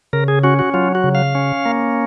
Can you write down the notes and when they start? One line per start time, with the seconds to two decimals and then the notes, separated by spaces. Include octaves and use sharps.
0.13 C#3 A#4
0.28 G#4
0.44 C#4 F#4
0.59 F#4
0.74 F#3 F4
0.95 F#4
1.04 C#3
1.15 F5
1.35 C#4
1.66 A#3